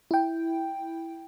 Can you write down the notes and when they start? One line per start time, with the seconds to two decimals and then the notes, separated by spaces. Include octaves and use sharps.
0.11 E4 G5